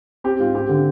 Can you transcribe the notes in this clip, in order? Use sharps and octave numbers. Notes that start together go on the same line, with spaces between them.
C4 G4
G#2 F4
C4 G4
D3